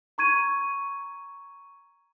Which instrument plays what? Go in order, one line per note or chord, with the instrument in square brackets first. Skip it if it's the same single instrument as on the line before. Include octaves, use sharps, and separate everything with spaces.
[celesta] A#5 C#6 G#6 D#7